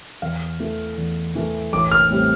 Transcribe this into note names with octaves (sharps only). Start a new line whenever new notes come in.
E2 F5
E3 A3
E2
E3 A3
A1 D6
F6
A2 G3 C4